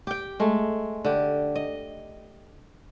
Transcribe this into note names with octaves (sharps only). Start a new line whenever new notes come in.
G4 G5
G#3 A3
D3 G4
D#5